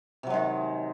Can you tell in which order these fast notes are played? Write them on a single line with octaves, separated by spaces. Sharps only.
C3 F#3 G#3 D#3